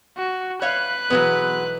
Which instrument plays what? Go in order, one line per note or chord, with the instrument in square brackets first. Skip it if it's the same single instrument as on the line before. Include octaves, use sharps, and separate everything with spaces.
[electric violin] F#4
[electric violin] B4 F#6 [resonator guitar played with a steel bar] C#5 E5 F5
[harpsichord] B1 E3 [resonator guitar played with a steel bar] F#3 G#3 B3